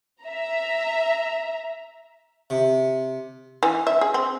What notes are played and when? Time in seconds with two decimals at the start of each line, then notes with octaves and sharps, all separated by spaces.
0.24 E5 A#5
2.50 C3
3.63 E3
3.87 E5
4.01 G#4
4.14 C4